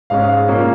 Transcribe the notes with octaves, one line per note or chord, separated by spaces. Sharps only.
G#2 G#3 C#4 F5
A#2 A#3 C#4